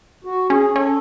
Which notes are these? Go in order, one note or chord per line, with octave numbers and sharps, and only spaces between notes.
F#4
C#4 G#4
C#4 A4